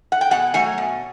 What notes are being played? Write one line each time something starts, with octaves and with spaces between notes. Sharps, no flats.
F#5
G5
B2 F#5 G#5
F#3 A3 F#5 G#5
B2